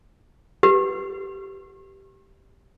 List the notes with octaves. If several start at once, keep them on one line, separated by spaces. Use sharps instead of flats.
G4 B4